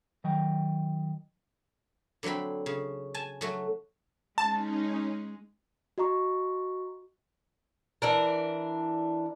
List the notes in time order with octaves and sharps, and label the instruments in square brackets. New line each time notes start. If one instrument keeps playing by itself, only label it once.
[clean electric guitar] D#3 F#3 D#5 G5
[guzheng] D3 F#3 A3 C4 B5
C#3
G#5 A5
F#3 A3 F#4
[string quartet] G#3 [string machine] C#4 D#4 [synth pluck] A5
[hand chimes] F#4 D#5 A#5 C#6
[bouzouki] E3 D4 A#4